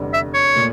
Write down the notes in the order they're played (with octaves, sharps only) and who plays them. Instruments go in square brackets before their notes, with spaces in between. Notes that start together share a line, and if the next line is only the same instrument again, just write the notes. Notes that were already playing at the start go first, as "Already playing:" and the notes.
Already playing: [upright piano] F1 E2 D3 G3
[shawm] E5
C#5
[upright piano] A#2 A3